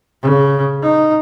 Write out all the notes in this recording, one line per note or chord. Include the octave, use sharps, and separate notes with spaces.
C#3
D#4